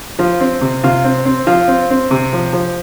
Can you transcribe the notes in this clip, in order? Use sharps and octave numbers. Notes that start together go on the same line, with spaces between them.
F3 F4
C4
C3
C3 F4
C4
C4
F3 F4
C4
C4
C3
F3
F3